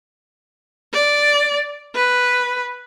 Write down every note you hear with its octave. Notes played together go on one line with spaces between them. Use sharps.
D5
B4